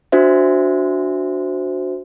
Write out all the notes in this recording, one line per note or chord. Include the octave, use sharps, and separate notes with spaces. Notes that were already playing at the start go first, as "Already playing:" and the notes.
D4 F#4 C5 E5